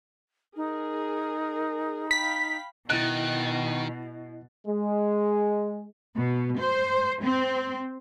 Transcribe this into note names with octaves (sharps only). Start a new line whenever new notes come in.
D#4 G#4 A#4
F5 G5 B5 B6
B2 D#3 E4 D#5 F#6 A6
G#3
B2
C5
C4